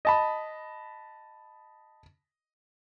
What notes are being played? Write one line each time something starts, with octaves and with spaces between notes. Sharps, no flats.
D#5 A5 B5